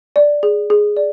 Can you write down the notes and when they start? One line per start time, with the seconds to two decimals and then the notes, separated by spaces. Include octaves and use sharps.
0.16 D5
0.43 G#4
0.70 G#4
0.97 D5